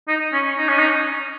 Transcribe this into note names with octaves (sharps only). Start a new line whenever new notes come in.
D#4
C#4
D#4
C#4
D#4